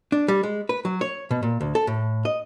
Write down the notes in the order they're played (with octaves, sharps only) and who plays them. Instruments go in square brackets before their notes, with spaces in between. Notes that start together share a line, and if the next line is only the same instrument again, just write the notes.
[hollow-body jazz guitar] D4
G3
G#3
B4
F#3
C#5
B2
A#2
D2
A4
A2
D#5